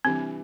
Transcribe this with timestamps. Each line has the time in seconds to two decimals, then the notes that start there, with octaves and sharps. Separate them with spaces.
0.05 C3 E3 G3 C4 D4